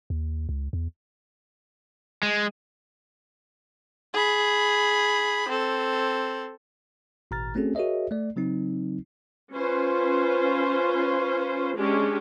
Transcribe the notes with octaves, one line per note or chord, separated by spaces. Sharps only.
D#2
C#2
E2
G#3
G#4 B5
C4 A4
G#1 A#2 A#5 F6 A6
A3 C4 C#4 F#4 G#4 A4
F#4 G#4 A#4 C#5 D#5 E5
A3 D5
C#3 F#3 C4 D#4
C#4 F4 B4 C5
G#3 C#4 D4 G4